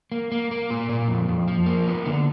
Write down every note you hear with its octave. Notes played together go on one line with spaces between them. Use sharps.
A#3
A#3
A#3
A#2
A#2
F2
F2
F3
A#3
B3
D3